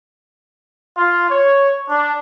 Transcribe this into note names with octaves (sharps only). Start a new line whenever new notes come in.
F4
C#5
D4